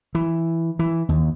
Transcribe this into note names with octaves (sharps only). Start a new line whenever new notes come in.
E3
E3
D#2